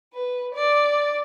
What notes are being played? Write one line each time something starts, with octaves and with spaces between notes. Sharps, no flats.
B4
D5